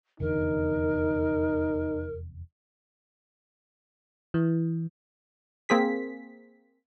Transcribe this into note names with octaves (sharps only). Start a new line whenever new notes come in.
F1 E2 D3 D#4 A#4
E3
A#3 C4 G#4 B6